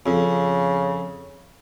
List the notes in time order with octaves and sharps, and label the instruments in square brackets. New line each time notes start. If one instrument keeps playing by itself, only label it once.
[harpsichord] F2 [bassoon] C#3